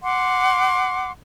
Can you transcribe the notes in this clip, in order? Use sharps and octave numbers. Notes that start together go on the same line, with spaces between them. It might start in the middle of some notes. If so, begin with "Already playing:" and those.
F#5 C6 D6